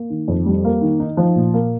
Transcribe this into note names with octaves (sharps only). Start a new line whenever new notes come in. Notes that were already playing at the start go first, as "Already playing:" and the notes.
Already playing: A#3
D#3
F2
G3
A#3
D#3
D#4
F3
A#2
A#3